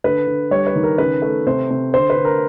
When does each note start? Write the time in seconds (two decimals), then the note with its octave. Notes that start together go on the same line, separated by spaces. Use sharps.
0.04 D3 B4
0.27 D3
0.51 G3 C#5
0.67 B4
0.76 D#3
0.84 A#4
0.98 C#3 B4
1.22 A3
1.47 C3 C5
1.70 C3
1.94 D3 C5
2.10 B4
2.17 D3
2.25 A#4